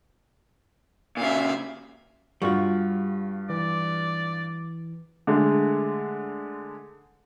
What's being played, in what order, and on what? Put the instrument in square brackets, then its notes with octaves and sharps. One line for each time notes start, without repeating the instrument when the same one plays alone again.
[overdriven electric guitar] A#2 C#3 [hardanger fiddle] E5 F5
[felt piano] G2 F4 C#6 [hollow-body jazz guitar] G3 F#4
[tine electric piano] E3 [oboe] D5
[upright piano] D3 G#3 A3